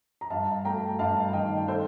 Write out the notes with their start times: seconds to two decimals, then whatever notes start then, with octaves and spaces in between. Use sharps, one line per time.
0.21 A#5
0.30 G2 F5 A5
0.65 A3 G5 A#5
0.99 G2 F5 A5
1.33 D#3 D#5 G5
1.68 A4 C5